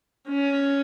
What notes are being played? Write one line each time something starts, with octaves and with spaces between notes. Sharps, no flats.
C#4